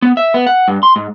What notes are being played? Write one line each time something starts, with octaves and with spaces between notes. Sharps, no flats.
B3
E5
B3
F#5
G2
C6
G#2